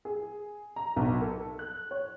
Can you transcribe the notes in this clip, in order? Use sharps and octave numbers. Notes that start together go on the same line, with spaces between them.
G#4
A#5
B1
A4
F#6
C#5